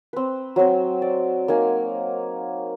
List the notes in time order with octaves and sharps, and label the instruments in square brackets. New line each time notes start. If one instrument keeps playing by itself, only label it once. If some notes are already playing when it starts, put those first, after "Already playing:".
[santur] C4 B4
F#3 C4
D5
A#3 D#4 G#5